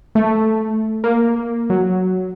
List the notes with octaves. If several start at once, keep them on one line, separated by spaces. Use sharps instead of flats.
A3
A#3
F#3